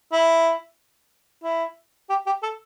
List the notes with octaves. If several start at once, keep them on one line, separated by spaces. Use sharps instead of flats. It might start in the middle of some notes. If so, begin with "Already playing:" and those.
E4
E4
G4
G4
A4